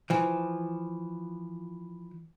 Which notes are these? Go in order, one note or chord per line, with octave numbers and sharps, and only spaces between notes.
E3 F3